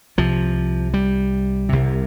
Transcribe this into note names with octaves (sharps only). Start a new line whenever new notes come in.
C2 C3 F3
G3
C2 C3